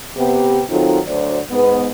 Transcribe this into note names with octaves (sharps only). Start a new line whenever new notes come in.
C3 B3 G4
D#3 F#3 C4 D#4 F4 A4
D2 D3 F#3 C5 D5
G#2 B3